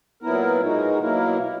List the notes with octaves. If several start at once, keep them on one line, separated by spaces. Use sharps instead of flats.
A#2 F#3 B3 E4 A#4
B2 G#3 D#4 F#4 A#4
B2 F#3 A#3 E4 A#4